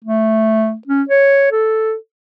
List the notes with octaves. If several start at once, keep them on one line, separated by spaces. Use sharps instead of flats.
A3
C#4
C#5
A4